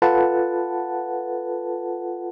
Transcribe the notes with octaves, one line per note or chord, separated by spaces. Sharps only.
F4 A4 B4 F#5 A5